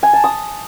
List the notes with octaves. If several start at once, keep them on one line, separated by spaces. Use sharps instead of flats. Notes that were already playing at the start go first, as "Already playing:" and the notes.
G#5
A5
D#6